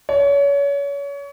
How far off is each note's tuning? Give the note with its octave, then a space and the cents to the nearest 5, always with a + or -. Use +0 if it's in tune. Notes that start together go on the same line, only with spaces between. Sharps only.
C#5 +30